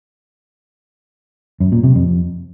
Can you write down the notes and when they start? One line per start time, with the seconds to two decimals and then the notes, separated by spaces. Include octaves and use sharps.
1.60 F#2
1.72 A#2
1.83 C3
1.95 F2